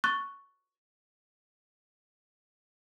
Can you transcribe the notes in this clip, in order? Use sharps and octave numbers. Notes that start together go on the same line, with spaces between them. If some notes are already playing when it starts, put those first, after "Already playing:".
C#6 F#6 A6